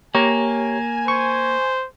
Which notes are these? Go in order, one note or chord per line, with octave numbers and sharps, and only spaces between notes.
A#3 G4 C#5 G#5 A#5
C5 C#6